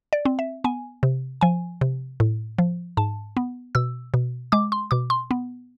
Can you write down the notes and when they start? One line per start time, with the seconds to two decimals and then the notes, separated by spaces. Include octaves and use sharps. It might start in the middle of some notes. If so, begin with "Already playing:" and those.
0.13 D5
0.25 C4
0.39 E5
0.64 B3 G#5
1.03 C3
1.41 F3 G#5
1.81 C3
2.20 A2
2.59 F3
2.97 G#2 A5
3.37 B3
3.75 B2 E6
4.14 B2
4.52 G#3 D6
4.72 C6
4.91 B2 D6
5.10 C6
5.31 B3